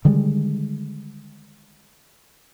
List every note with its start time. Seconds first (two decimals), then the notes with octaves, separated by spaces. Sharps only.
0.05 D3 D#3 G3 G#3